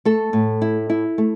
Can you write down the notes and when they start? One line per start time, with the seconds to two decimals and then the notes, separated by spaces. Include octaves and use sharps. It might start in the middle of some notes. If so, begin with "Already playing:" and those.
0.05 A3 A4
0.33 A2
0.62 E4
0.90 E4
1.18 A3